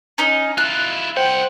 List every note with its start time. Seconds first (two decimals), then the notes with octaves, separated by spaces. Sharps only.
0.18 C#4 D#4 D#5
0.58 E4 F4 F#6
1.17 C2 C5 F#5 G5